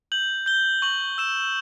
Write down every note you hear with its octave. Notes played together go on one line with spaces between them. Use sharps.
G6 F#7
G6 G7
C#6 F#7
E6 E7